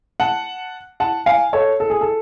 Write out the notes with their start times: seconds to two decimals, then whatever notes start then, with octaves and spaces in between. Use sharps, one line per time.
0.20 F#5 A5
1.00 F#5 A5
1.26 F5 G#5
1.53 A4 C#5
1.80 A4
1.90 G#4
2.01 A4